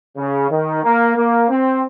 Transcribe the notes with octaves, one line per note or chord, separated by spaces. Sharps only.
C#3
D#3
A#3
A#3
C4